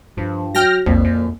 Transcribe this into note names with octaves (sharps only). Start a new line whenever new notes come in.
G2 F3
F#3 G5 F6 A#6
B1 F2 A#2
F#2